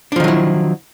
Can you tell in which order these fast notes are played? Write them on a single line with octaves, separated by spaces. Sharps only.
D4 F3 D#3 F#3 E4